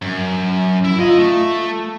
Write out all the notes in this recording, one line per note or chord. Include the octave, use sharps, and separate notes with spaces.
F#2
E4
F4 A#4 D#5
A3